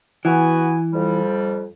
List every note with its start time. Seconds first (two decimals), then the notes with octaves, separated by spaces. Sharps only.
0.25 E3 B3 F#4 G#5
0.93 F2 G3